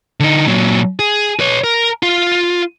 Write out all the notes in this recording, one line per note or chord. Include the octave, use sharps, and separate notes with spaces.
D3 D#4
A#2 F#3
G#4
B4 C#5
A#4
F4